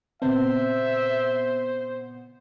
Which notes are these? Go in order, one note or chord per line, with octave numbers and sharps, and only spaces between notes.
A#2 C#3 B3 C4 C5 E5